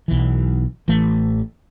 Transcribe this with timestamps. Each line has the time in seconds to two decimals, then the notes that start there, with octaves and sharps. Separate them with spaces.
0.08 B1 E3
0.88 A1 E3 A3